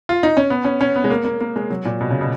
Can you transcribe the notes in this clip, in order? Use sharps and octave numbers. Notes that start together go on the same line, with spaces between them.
F4
D#4
C#4
B3
C#4
C#4
B3
G#3
A#3
A#3
A#3
G#3
F#3
A#2
B2
C#3
B2